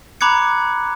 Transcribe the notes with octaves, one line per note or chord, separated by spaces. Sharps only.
A#5 B5 D6 F#6 G#6 C#7